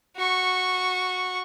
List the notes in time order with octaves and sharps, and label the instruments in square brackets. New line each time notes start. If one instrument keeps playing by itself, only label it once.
[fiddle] F#4 C#6